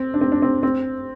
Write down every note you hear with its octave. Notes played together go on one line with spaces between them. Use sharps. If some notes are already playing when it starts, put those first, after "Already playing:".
Already playing: C4
D4
C4
D4
C4
C4